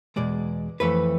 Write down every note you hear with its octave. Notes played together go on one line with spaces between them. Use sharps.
E2 B2 G#3 D5
F2 E3 A3 B4